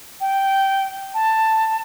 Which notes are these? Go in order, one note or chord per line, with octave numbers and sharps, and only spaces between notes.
G5
A5